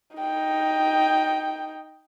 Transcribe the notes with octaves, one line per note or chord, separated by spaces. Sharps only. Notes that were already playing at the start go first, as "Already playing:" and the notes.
D#4 G5